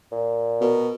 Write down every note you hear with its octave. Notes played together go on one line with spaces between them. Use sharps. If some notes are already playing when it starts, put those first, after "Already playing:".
A#2
B2 A#4